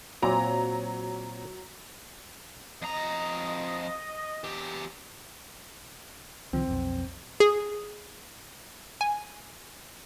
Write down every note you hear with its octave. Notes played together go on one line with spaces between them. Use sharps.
A#2 F#3 C4 D5 A#5
F2 D#5 A#5
E2 G4
C2 D#3 F3 C4
B1 F2
G#4
G#5